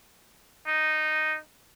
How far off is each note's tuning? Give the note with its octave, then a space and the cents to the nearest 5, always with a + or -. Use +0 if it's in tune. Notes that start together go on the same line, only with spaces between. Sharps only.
D#4 -5